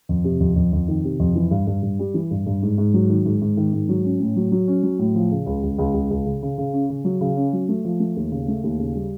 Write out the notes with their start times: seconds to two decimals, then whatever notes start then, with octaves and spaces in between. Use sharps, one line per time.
0.09 F2
0.24 C3
0.40 F2
0.56 F2
0.73 F2
0.88 D#3
1.04 C3
1.19 F2
1.35 E3
1.51 G2
1.67 G2
1.83 G2
1.99 G3
2.14 E3
2.31 G2
2.46 G2
2.62 G#2
2.78 G#2
2.94 F#3
3.10 D#3
3.26 G#2
3.41 G#2
3.57 D#3
3.73 G#2
3.89 F#3
4.05 C#4
4.20 A2
4.36 F#3
4.52 F#3
4.68 C#4
4.83 F#3
4.99 A2
5.15 F3
5.31 C#3
5.46 C#2
5.63 C#2
5.78 C#2
5.94 C#2
6.10 C#2
6.26 C#3
6.42 C#3
6.58 C#3
6.73 C#4
6.90 C#3
7.05 F#3
7.21 C#3
7.37 C#4
7.53 F#3
7.69 A3
7.85 F3
8.00 A3
8.16 D#2
8.31 C#3
8.48 A3
8.64 D#2
8.79 C#3
8.95 G3